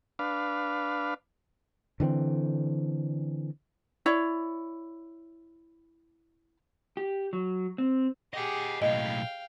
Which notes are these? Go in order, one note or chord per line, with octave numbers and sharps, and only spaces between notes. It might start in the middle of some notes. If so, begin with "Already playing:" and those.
D4 B4 F5
D3 E3 G#3 C4
E4 C#5 D5
G4
F#3
C4
G4 G#4 D#5 F#5
B1 A2 D#5 F5 G5